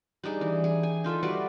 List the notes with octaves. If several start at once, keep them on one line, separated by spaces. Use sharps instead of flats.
G3 D4 D#4 G#4
E3
G#4
G#5
D#4 F4 A4 E5
G3 F#4 B4 D5